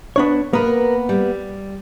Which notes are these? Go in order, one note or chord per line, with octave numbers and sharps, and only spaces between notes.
B3 D4 C#5
A#3 B3 A#4 B4
G3